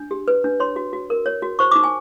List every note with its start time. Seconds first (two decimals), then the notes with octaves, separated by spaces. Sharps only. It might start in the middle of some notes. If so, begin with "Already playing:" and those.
Already playing: D4
0.11 G4
0.28 B4
0.44 D4
0.60 C#5 C6
0.76 F#4
0.93 F#4
1.10 A#4
1.26 C#5
1.42 F#4
1.59 C5 C#6
1.71 D#4 D6
1.84 G#5